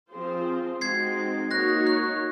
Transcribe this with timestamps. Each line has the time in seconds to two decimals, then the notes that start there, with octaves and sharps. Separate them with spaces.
0.12 F3 C4 F4 G#4 C5
0.81 G#3 C4 D#4 F#4 G#6 C7
1.51 A#3 D#4 F#4 C#5 F#6 A#6
1.87 F#6